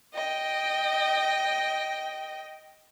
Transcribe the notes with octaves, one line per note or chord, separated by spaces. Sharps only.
D#5 G5